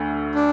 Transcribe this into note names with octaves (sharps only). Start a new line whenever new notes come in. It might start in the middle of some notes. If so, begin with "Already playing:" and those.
Already playing: D2 D3 A3
D4